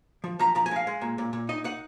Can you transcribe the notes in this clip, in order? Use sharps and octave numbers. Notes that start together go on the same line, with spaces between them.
F3
F3 A#5
F3 A#5
G#5
G#3 F5
G#3
A#2
A#2
A#2
D#4 D#5
D#4 F#5